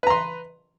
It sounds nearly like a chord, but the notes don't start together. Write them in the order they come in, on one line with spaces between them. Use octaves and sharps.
B4 A#5 C6